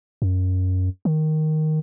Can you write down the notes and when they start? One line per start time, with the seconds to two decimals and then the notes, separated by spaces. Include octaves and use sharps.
0.22 F#2
1.05 D#3